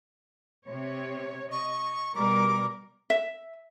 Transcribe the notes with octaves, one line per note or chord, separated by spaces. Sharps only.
C3 C#5
D#5 C#6
B2 G3 A#4 D6
E5